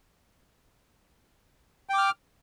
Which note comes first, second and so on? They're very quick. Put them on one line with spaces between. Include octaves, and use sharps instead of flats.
G5 D6 F6